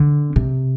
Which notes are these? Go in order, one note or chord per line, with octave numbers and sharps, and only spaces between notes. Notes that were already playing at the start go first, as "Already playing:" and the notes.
Already playing: D3
C3